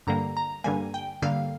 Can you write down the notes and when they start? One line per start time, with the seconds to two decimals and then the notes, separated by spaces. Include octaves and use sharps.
0.07 G2 D3 G3 A#3 A#5
0.37 A#5
0.64 G2 D3 G3 A#3 G#5
0.94 G5
1.22 G2 D3 G3 A#3 F5